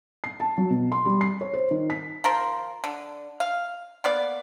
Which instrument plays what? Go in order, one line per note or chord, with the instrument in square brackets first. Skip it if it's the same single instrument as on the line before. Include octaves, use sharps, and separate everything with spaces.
[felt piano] C7
A5
F#3
B2
C6
G3
C7
C#5
C5
D#3
B6
[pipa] F3 A#4 C5
D3
F5
A#3 B3 D5